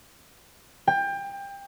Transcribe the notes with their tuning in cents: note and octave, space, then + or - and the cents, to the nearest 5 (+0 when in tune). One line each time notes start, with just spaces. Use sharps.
G5 +25